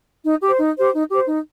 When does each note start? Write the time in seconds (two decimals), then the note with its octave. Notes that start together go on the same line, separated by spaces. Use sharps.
0.24 D#4
0.42 G4 C5
0.59 D#4
0.76 G4 C5
0.93 D#4
1.10 G4 C5
1.27 D#4